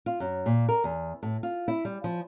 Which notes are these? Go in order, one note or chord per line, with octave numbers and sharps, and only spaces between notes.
F4
F#2
A#2
A#4
E2
A2
F4
E4
G3
F3